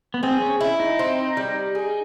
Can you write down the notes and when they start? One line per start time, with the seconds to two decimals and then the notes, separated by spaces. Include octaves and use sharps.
0.14 B3
0.23 C4 G#4
0.42 C#4
0.61 E4
0.80 D#4
0.99 C4
1.37 G3
1.75 G#4